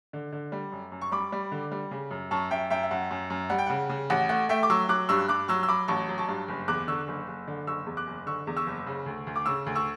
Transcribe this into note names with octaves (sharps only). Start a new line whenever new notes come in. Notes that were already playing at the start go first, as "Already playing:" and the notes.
D3
D3
G3
F#2
F#2
C#6
G3 B5 D6
G3
D3
G3
C#3
F#2
F#2 A5 C#6
F#2 E5 G5
F#2 E5 G5
E5
F#2 F#5
F#2
F#2
G3 F#5
G5
C#3 F#5
C#3
A1 F#5
A3 F#5
A3 E5 G5
D6
F#3 C#6 E6
F#3 D6 F#6
G2 C#6 E6
G2 D6 F#6
F#3 C#6 E6
E6
F#3 B5 D6
A1 A5 C#6
F#3
A5 C#6
G2
F#1
E2 D6 F#6
D3 C#6 E6
F#1
F#1
D3
F#1 C#6 E6
E2
D6 F#6
F#1
D3 C#6 E6
E2
C#6 E6
F#1
C#3
D2
D2
D6
C#3 C#6 E6
D2
C#6 E6